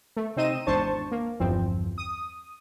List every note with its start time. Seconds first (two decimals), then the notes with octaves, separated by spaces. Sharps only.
0.17 A3
0.36 C3 C4 D#4 D#5 D#7 E7
0.67 G#1 E2 D4 C5 A5 C#6
1.11 A#3
1.40 G1 E2 G2 F3 C4
1.98 D#6